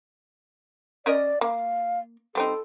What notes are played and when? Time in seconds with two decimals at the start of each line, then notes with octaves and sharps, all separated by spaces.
1.06 C#4 A#4 D5 D#5
1.41 A#3 F5
2.35 G3 C4 D#4 A4